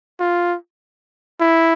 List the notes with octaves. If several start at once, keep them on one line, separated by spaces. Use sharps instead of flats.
F4
E4